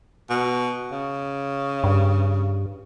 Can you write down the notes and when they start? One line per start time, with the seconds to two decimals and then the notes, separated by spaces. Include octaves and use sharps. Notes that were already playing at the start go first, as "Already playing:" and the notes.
0.30 B2
0.91 C#3
1.84 G2